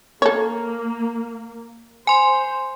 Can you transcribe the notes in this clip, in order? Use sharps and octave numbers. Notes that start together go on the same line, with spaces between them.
A#3 A4 C#5
C5 G#5 C6